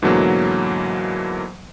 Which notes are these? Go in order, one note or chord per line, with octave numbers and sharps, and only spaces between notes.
G#2 B2 D3 E3 F#3 A#3